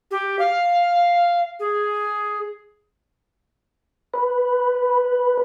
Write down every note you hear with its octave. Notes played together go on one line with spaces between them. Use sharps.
G4
F5
G#4
B4